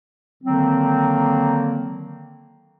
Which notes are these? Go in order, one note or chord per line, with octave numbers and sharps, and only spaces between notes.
D3 D#3 F#3 A#3 C4